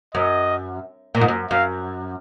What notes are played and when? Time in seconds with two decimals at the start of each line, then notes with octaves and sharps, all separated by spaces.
0.15 F#2 D#5
1.15 A#2
1.21 G#2
1.28 F#2
1.51 F#2 F5